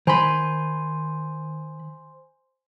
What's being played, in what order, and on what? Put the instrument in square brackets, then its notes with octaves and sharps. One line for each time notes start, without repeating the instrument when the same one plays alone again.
[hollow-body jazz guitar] D#3 B5 [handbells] C5 G#5 C6